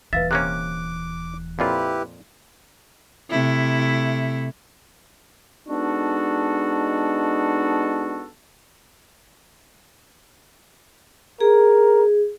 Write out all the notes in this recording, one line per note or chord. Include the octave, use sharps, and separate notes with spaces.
D#1 E3 B4 E5 F5 A6
C3 A#3 C#4 D6 F#6
F2 A#2 E4 F4 G4 B4
C3 A3 E4
G#3 B3 D4 D#4 F#4 A4
G#4 A#4